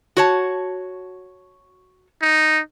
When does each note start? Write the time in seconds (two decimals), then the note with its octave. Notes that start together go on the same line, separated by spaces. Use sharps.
0.17 F#4 C#5 A5
2.22 D#4